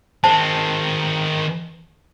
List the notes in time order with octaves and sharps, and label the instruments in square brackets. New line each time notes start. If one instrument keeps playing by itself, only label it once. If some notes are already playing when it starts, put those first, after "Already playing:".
[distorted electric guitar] D#3 C4 [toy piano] C5 A5